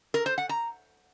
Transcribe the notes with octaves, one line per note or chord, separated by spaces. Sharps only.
A#4
C5
F#5
A#5